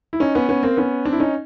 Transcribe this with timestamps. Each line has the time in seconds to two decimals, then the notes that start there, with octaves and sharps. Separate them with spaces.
0.13 E4
0.20 C#4 D#4
0.35 B3 C#4
0.49 B3 C#4
0.63 A#3 C4
0.77 B3 C#4
1.05 C4 D4
1.13 E4
1.19 C#4 D#4